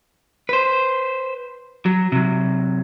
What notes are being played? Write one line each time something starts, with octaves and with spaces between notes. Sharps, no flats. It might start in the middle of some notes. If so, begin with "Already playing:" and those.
B4 C5
F#3
C3 F#3